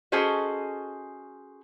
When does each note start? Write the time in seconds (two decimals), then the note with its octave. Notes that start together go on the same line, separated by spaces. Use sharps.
0.12 C#4 F#4 G#4 A4 C5 D#5